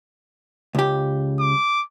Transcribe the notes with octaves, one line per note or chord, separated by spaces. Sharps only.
C#2 G4
D6